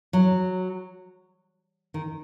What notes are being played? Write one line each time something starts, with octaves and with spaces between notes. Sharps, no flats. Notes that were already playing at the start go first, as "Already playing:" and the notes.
F#3
D#3